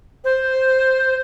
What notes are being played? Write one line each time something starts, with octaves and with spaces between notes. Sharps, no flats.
C5